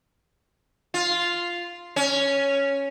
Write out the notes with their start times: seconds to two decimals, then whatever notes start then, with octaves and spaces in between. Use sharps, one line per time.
0.94 F4
1.96 C#4